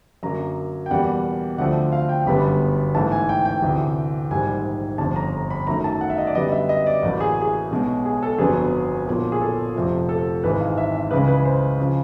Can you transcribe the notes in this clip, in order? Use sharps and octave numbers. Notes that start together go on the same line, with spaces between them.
F#2 D3 F#3 A#3 A#5
G5
E2 B2 G3 A#3 F#5
D2 D3 F3 A3 C4 F#5
F5
G5
G1 F#2 D3 G3 B3 B5
A1 G#2 E3 A3 A5
G#5
G5
G5
D2 C3 E3
A#1 G#2 D#3 G3 G#5
G1 F2 D3 A5
A#5
A#5
B5
F#2 D#3 F#3 A3 A#5
A5
F#5
E5
D#5
D5
F#2 D3 G3 B3 D#5
E5
D#5
D5
A1 A2 F#3 A#3
G#4
G#4
B1 B2 G#3
G#4
A4
G1 F2 D3 F#3 B3 G#4
B1 A#2 F3 A#3
G#4
A4
F1 F2 C3 F3
A4
G#1 G#2 E3 G#3 B4
F5
E5
E5
C#2 C#3 E3 G#3 B4
B4
C5
C#3 F3